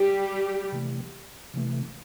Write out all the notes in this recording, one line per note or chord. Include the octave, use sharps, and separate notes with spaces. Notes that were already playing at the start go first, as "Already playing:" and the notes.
Already playing: G3 G4
C3 E3 A3
C3 E3 A3